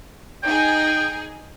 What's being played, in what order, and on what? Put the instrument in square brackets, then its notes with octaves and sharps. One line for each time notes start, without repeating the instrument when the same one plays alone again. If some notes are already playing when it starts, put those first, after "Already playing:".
[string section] D#4 G#4 [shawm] G5